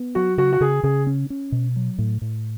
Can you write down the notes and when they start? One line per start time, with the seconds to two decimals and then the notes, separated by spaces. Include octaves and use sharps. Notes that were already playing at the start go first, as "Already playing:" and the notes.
Already playing: B3
0.15 F#3 F#4
0.38 C#3 F#4
0.53 F#4
0.61 C#3 G#4
0.83 C#3 G#4
1.07 C#4
1.30 C#4
1.52 B2
1.76 F#3
1.99 A2
2.22 A2